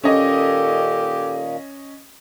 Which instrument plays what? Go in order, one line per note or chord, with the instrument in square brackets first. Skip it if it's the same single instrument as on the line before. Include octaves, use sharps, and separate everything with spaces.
[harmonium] A#2 D#3 A#3 [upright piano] C#4 D#5 [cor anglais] G4 [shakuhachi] A4